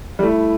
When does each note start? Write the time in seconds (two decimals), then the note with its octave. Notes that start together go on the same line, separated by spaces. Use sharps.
0.19 G3
0.23 A3 E4